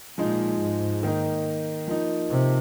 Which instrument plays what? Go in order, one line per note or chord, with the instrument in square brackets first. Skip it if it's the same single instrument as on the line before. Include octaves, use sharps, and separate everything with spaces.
[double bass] A#2 [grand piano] F3 G#3 D#4
[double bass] G#2
[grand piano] D#3 A#3 D#4
F3 A#3 D#4
[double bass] C3